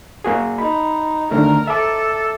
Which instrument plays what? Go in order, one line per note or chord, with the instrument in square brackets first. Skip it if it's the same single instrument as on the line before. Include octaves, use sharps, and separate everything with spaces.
[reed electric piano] A#3 F#4 G#4
[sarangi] D#4 [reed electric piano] B5
[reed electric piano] D3 D#3 A3 [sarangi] A#4
[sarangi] A4 [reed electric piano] E5 D6